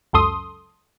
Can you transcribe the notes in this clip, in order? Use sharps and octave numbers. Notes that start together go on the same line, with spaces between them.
C#2 F#2 A4 C6 D#6